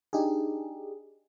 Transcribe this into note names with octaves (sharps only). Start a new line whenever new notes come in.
D4 D#4 G4 G#4